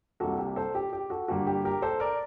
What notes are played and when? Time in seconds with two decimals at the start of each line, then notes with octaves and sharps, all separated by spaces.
0.20 C2 C3 G3 A#3 F#4 A4
0.39 G4
0.56 A4 C5
0.75 G4
0.93 G4
1.10 F#4 A4
1.28 G2 D3 G3 A#3 F#4
1.47 G4
1.65 G4 A#4
1.82 A4 C5
2.00 A#4 D5